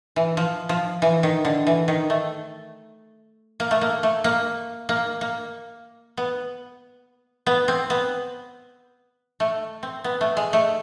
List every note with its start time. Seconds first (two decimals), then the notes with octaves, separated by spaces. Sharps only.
0.16 E3
0.37 F3
0.69 F3
1.02 E3
1.23 D#3
1.45 D3
1.67 E3
1.88 D#3
2.10 A3
3.60 A#3
3.71 A3
3.81 A#3
4.03 A3
4.24 A#3
4.89 A#3
5.21 A#3
6.17 B3
7.46 B3
7.68 C4
7.90 B3
9.40 A3
9.83 C4
10.04 B3
10.21 A3
10.37 G#3
10.53 A3